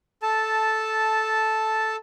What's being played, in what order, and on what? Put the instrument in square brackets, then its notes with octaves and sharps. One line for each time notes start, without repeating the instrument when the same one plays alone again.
[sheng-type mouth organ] A4 A5